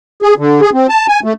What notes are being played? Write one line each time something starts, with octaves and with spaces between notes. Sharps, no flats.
G#4
D3
G#4
C4
A5
G#5
A3